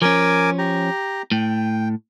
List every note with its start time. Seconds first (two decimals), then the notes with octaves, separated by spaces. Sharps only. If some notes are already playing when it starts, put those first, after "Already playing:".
0.02 F3 C#4 A#4 G#5 D6
0.58 G4 A#5
1.32 A2 G5